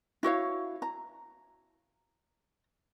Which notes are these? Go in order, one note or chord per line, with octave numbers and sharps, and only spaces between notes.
E4 F#4 C#5 F5
A#5